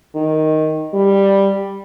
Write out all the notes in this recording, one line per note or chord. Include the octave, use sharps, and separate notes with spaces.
D#3
G3